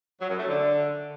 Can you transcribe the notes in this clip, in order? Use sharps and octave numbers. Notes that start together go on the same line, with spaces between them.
F#3
F#2
A3
D3